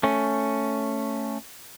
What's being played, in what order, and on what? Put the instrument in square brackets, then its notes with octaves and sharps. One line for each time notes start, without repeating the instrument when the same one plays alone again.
[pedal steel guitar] A3 C#4